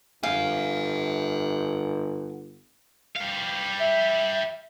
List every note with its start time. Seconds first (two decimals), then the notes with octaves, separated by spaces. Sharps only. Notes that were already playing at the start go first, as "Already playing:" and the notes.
0.23 G1 F5 F#5 G#5
3.16 G3 F5
3.79 E5